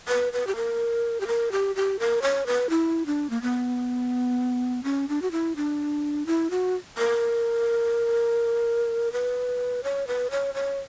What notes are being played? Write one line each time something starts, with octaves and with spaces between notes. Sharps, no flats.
B4
B4
G4
A#4
G4
A#4
G4
G4
A#4
C#5
B4
E4
D4
A#3
B3
C#4
D4
F#4
E4
D4
E4
F#4
A#4
B4
C#5
B4
C#5
C#5